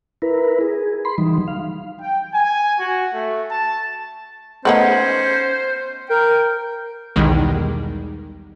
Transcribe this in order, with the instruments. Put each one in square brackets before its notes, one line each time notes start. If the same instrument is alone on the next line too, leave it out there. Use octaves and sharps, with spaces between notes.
[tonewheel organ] E4 A#4 B4
G#4
B5 C6
E3 F#3 G3 D#4
F5
[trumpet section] G5
G#5
F#4
A3
A5
[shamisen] A3 B3 D#4 [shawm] C#4 [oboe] C5
[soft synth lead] A#4 [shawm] G5
[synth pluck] B1 E2 D#3 G3 G#3